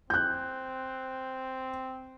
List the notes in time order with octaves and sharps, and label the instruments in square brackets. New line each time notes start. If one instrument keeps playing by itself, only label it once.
[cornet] C4 [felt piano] F#6 G6